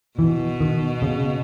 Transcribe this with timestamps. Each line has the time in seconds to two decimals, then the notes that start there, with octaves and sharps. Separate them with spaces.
0.19 B2 E3
0.60 D#3
1.02 C#3